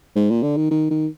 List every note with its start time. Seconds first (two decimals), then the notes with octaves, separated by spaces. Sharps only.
0.16 G#2
0.30 A#2
0.43 D3
0.57 D#3
0.71 D#3
0.91 D#3